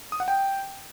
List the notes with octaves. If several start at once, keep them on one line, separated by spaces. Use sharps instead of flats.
D#6
F#5
G5